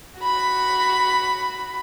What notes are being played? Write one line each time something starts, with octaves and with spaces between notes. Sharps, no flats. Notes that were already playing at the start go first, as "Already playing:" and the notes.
F#4 B5